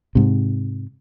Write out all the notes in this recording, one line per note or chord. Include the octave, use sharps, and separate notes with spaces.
G#2 C3